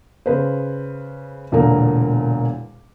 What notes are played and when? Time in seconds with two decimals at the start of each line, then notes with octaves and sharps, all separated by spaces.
0.26 C#3 B4 C5
1.52 E1 E2 A#2 D3 A#4